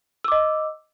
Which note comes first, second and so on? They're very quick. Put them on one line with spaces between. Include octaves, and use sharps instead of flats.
E6 D6 D#5